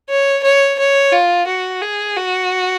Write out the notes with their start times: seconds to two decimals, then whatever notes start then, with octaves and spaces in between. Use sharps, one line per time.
0.09 C#5
0.43 C#5
0.79 C#5
1.12 F4
1.47 F#4
1.81 G#4
2.16 F#4